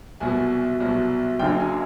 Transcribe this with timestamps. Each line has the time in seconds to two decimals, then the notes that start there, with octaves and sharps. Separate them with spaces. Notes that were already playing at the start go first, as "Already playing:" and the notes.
0.20 C2 B2 F#3 G#5
0.80 C2 B2 F#3
1.39 F#1 F#2 D3 F#3 G5
1.60 G#5